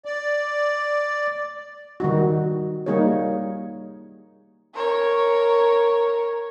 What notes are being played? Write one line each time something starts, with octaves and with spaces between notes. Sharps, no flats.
D5
D#3 G3 D#4 F#4
G3 A#3 D#4 G#4 C#5
A#4 C#5